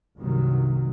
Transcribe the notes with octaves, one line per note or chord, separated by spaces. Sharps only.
G1 C2 C3 D#3 F#3